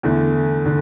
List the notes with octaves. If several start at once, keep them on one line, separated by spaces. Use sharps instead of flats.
E2 D3 A3
D3